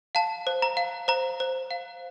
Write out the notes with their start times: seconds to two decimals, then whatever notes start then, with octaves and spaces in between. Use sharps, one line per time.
0.15 F5 A5
0.47 C5
0.62 A#5
0.77 F5
1.08 C5 A#5
1.40 C5
1.71 F5